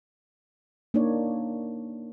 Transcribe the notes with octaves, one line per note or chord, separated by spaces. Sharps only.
A#3 D4 D#4 C#5 D5